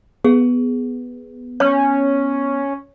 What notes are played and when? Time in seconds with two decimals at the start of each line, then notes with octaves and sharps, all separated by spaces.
0.24 B3 G#4
1.60 C#4 C#5